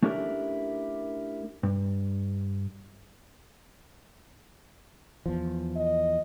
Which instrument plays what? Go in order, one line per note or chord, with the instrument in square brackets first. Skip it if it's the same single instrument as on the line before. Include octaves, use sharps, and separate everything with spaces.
[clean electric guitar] A3 C#4 D4 E4 G4 A#4
G2
[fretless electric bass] E2 F3
[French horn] D#5